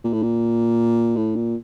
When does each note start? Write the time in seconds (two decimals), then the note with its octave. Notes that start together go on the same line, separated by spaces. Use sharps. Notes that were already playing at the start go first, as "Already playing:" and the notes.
0.04 A#2
0.13 A2
0.23 A#2
1.17 A2
1.36 A#2